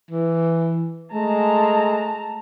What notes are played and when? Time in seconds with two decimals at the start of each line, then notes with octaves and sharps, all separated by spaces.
0.11 E3
1.14 G#3 A3 A5 A#5